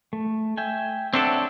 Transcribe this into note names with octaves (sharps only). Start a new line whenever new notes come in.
A3
E5 G5 G#5
C4 D4 A4 C#5 E5 F#5